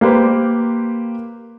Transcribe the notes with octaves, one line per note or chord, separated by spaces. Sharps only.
A#3 G4 B4 C5